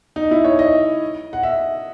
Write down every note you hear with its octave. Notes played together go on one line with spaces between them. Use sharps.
D#4
E4
C#5
D#5
F#5
E5